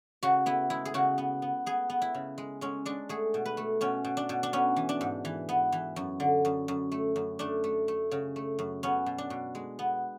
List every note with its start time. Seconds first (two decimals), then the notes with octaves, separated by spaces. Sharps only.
0.23 C#3 F#4
0.46 B3 E4
0.70 G#3 E4
0.85 G#4
0.94 C#3 F#4
1.18 B3
1.42 B3
1.66 B3 G#4
1.90 B3
2.02 E4
2.15 C#3
2.38 G#3
2.61 G#3 C#4
2.85 G#3 D4
3.09 A3 G#4
3.34 B2
3.46 B4
3.57 A3
3.81 B2 C#4
4.05 B2
4.17 D4
4.29 B2
4.43 D4
4.53 B3 C#4
4.76 E3
4.89 D4
5.01 G#2
5.25 E3
5.49 B3
5.72 E3
5.96 F#2
6.20 D3
6.45 F#2
6.68 F#2
6.92 A3
7.16 F#2
7.39 A3 D4
7.64 A3
7.88 A3
8.11 C#3
8.36 A3
8.59 F#2
8.83 B3 C#4
9.06 B2
9.18 D4
9.30 B2
9.55 G#3
9.79 B3